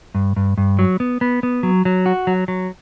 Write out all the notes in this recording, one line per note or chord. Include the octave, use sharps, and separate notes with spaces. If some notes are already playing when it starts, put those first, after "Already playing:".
G2
G2
G2
F#3
B3
B3
B3
F#3
F#3
F#4
F#3
F#3